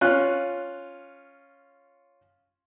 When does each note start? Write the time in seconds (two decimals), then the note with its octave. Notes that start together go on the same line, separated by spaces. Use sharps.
0.01 C#4 F4 F#6